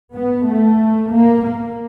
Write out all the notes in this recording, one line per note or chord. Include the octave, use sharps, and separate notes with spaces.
B3
A3
A#3
A#3